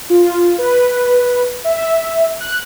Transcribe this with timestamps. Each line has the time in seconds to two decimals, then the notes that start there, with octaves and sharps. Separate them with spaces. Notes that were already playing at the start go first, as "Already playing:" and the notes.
0.10 F4
0.58 B4
1.64 E5
2.40 F#6